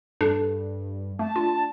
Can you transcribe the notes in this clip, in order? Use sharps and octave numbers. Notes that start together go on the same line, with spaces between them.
G2 D4 A4
A3 A5
D4 F4